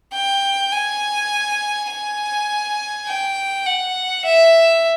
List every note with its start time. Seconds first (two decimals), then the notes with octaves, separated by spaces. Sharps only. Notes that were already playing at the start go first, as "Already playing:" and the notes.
0.13 G5
0.72 G#5
1.90 G#5
3.07 G5
3.66 F#5
4.25 E5